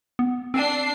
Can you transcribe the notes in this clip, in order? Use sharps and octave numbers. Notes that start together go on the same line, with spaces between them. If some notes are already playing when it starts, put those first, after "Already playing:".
B3
C4 D4 C7